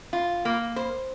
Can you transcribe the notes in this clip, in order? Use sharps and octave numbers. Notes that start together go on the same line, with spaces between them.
F4
A#3
C5